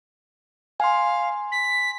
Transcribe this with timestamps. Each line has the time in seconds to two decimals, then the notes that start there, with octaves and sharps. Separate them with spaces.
0.80 F5 G#5 C6
1.52 B6